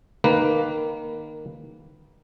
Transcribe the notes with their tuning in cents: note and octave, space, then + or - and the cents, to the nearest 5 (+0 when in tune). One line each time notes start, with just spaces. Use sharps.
D#3 -15 A#3 +0 B4 +0